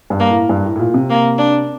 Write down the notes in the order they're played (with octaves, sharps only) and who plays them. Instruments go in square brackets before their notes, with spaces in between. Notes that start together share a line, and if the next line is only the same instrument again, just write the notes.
[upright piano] G2
[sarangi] A#3
[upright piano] A2
G2
A2
A2
A#2
C3
[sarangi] A#3
D4